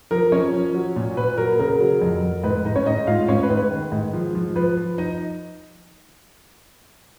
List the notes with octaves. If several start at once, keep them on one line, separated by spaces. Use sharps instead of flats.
F3 A#4
F3 C#4 C#5
F3
F#3
A#2
A#2 B4
F#3 A#4
C#3 A#4
F#3
F2
F2
G#2 B4
G#2 D#4 D#5
C#4 C#5
G#2 D#4 D#5
G#2 F4 F5
G#2 C#4 C#5
B4
G#2
B4
D#3
G#2
F3
F3
F3 B4
F3
D#4 D#5